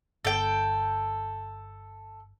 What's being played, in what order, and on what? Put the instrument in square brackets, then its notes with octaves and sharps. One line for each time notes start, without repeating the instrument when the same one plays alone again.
[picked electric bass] G1 [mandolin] A4 G5